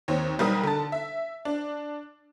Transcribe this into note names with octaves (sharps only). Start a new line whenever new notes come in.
D#2 C4 C#5
B1 G3 A#4 D#6
D3 A5
E5
D4